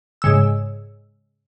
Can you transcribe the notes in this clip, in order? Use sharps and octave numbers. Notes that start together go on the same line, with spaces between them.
G#2 C#3 E6